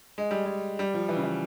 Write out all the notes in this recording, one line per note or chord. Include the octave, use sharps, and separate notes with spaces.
G#3
G3
G#3
G3
F3
E3
C#3
E3